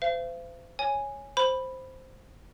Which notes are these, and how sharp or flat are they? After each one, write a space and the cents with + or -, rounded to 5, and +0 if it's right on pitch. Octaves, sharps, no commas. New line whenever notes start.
C5 -35 F5 -45
C#5 +0 G#5 -5
C5 +0 B5 +0